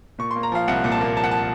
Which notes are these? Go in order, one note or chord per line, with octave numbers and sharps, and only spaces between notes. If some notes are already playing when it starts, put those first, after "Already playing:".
A#2 C#6
C6
A#3
A#5
F3 F5
C2 F#5
A#2
A5
A#3
F3 A5
F#5
A5